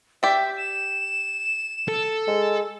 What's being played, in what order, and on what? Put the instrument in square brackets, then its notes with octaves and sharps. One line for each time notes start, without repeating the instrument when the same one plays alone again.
[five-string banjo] G4 D5 [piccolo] E5
[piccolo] E7
[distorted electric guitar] A4
[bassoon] G#3